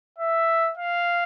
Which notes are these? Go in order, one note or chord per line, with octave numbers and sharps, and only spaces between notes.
E5
F5